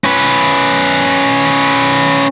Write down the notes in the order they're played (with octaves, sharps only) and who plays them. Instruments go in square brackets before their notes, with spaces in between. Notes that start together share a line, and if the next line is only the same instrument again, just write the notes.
[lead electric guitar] C#4 B4